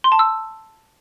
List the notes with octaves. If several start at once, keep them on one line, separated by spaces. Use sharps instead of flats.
C6
A5
E6